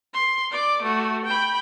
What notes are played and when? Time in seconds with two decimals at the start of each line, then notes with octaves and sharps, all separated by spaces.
0.14 C6
0.51 D5 D6
0.82 A3 F#4
1.25 G5 B5